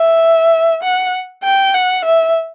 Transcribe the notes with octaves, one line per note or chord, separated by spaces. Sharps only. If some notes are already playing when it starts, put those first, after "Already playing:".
Already playing: E5
F#5
G5
F#5
E5